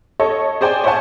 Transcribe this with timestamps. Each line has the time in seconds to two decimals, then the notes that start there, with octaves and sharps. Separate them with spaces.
0.20 A4 C#5 D#5
0.61 G#4 C5 D5 G5 G#5
0.84 C5 C#5 E5 F#5 G#5 A5